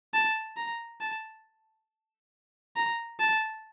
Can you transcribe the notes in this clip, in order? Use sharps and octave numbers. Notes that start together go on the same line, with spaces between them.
A5
A#5
A5
A#5
A5